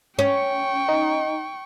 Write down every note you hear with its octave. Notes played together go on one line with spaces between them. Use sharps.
C#4 G5 C#6
D#4